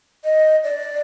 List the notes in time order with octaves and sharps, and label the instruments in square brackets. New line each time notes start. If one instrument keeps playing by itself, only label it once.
[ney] D#5
D5